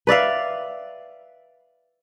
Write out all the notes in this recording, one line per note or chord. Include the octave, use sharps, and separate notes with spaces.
B4 D5 E5 F5